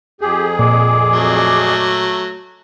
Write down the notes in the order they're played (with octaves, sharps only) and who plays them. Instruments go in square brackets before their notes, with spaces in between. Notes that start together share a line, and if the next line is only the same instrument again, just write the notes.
[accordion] F2 G#4 [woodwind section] G4
[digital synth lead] A#2 [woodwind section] D5 D#5 D6
[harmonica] F#3 A3